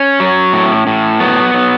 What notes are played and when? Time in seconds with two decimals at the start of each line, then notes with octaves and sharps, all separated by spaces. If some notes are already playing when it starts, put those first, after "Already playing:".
Already playing: C#4
0.20 F#3
0.53 A2
0.87 A2
1.20 F#3 B3
1.54 F#3